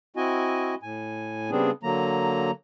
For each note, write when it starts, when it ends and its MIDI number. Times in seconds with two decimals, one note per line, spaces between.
0.16 0.75 60
0.16 0.75 64
0.16 0.75 66
0.16 0.75 75
0.16 0.75 80
0.82 1.51 45
0.82 1.51 80
1.51 1.71 49
1.51 1.71 55
1.51 1.71 59
1.51 1.71 60
1.51 1.71 62
1.51 1.71 68
1.83 2.51 50
1.83 2.51 54
1.83 2.51 58
1.83 2.51 82